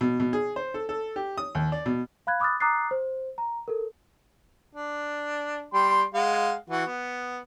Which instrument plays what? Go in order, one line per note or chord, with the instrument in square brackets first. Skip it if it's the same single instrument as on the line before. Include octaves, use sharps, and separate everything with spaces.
[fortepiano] B2
B2
G#4
C5
A4
A4
G4
D#6
D#2
D5
B2
[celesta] F5 B5 F#6 G#6
B5 D6 D#6 F6 F#6 A6
A#5 D6 D#6 F#6 A6 C7
C5
A#5
A4 A#4
[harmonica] D4
G3 G5 C6
G#3 F5 F#5
E3 F#4
B3